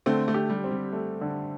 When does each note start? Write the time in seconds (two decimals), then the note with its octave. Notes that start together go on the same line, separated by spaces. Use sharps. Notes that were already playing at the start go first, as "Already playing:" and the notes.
0.06 D3 A3 C4
0.28 A3
0.34 G4
0.50 G3
0.64 C4
0.71 G3
0.92 A3
1.21 D3